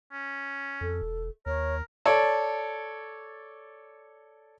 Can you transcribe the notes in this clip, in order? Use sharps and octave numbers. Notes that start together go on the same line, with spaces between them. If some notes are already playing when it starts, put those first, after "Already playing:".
C#4
F2 A4
E1
D#2 A#4 C#5
A4 C#5 D5